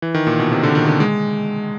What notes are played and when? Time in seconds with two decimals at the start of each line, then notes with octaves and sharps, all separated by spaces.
0.02 E3
0.14 D#3
0.27 A#2
0.39 B2
0.52 C3
0.63 D3
0.75 D#3
0.87 D3
1.00 G#3